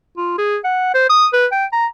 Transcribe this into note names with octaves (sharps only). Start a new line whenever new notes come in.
F4
G#4
F#5
C5
D#6
B4
G5
A#5